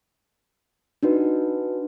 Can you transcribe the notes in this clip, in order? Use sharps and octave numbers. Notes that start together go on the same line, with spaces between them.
D4 D#4 F#4 B4